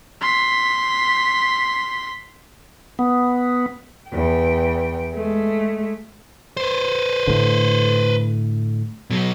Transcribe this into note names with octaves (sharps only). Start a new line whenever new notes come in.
C6 B6
B3
E2 G5
G#3 A3
B4 C5
A2 D3
B2 F#3